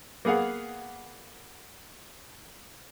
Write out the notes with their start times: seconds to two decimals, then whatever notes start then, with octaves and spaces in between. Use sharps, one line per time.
0.25 A#3 B3 G#4 F5 F#5